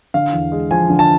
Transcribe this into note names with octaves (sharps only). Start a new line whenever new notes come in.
D3 F5
E2
G#3
F3 G#5
D3
A5